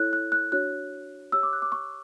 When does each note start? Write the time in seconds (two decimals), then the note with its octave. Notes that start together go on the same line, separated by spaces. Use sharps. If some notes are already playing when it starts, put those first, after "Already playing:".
Already playing: E4 A4 C#5 F#6
0.13 F#6
0.32 F#6
0.52 D4 F#4 C#5 F#6
1.32 G4 C#5 E6
1.43 D6
1.53 F#6
1.62 D6
1.72 C#6